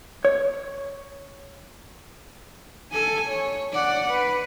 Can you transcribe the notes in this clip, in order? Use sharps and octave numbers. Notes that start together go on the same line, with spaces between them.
C#5
A4 G#5
C#5
D5 F#5
B4